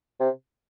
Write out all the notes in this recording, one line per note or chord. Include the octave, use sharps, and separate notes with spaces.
C3